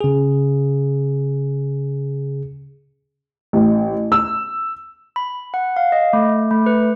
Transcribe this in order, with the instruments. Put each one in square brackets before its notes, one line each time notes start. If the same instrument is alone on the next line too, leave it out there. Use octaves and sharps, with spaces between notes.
[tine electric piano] C#3 G#4
[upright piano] A1
E6
[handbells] B5
F#5
F5
D#5
A3
A3
B4